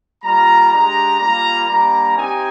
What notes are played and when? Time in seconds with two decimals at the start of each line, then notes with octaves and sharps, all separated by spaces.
0.23 G3 A#3 F4 A#5
0.72 G#3 D4 G4 A#5
1.19 G3 A#3 F4 A#5
1.68 G3 A#3 D4 A#5
2.16 C4 D#4 G4 G#5